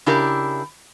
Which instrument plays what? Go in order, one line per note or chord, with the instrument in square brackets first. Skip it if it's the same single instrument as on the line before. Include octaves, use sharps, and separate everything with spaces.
[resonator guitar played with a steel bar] C#3 D4 E4 G4 A#4